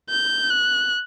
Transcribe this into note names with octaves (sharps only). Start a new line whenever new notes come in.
G6
F#6